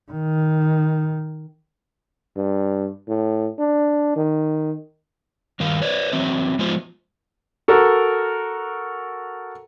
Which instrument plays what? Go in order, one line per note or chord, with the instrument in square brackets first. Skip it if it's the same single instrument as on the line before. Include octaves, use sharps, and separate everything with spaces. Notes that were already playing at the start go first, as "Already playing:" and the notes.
[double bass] D#3
[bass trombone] G2
A2
D4
D#3
[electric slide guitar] G2 D#3 A#4 F5
B4 C#5 D5
E3 F#3 C4 E5
F3 G#3 B3 F4 C5
[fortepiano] F#4 A4 A#4